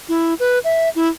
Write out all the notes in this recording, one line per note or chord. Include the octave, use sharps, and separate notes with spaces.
E4
B4
E5
E4